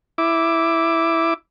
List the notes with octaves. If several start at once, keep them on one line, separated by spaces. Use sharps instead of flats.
E4 D6